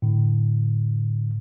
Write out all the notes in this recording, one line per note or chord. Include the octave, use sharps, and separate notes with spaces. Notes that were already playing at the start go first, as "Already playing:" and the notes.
A2 D3